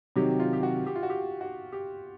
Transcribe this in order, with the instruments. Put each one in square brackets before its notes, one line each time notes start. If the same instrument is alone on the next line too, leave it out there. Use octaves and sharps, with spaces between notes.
[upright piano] C3 D#3 F#3 [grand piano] G4
[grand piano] F4
G4
F#4
G4
F4
F#4
G4
F#4
G4